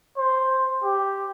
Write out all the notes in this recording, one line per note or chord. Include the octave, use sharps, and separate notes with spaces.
C5
G4